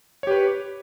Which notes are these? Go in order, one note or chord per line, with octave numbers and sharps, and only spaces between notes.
G4 B4 C#5